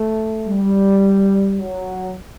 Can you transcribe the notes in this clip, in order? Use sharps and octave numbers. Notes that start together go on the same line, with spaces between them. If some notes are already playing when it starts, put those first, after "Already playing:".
Already playing: A3
G3
F#3